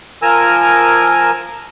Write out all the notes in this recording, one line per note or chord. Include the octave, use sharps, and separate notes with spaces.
F3 A#4 G#5 A#5 E6